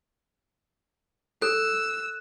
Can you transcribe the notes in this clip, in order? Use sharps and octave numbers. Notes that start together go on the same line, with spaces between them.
A4 E6 F#6